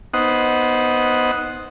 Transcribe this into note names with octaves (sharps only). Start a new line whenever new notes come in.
B3 D#4 C5 D#5 F#5